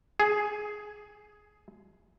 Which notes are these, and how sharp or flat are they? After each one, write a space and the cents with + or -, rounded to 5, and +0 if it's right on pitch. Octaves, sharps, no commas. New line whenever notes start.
G#4 +10